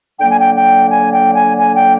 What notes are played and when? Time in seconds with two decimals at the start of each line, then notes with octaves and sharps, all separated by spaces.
0.20 D3 F#3 A#3 G5
0.30 G#5
0.39 G5
0.55 G5
0.90 G#5
1.12 G5
1.35 G#5
1.58 G#5
1.75 G5